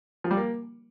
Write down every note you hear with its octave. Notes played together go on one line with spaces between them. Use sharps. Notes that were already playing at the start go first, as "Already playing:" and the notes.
F3
G3
A#3